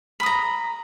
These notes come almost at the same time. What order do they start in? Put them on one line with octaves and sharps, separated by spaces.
B5 D#6 A#5